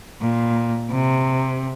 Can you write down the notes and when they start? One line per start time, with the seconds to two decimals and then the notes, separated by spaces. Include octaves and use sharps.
0.21 A#2
0.91 C3